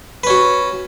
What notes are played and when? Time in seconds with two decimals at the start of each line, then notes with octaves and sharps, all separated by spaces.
0.24 B4
0.27 C#4
0.30 F#4